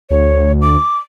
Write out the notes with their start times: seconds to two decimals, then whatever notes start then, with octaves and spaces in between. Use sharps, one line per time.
0.10 D2 C#5
0.61 D6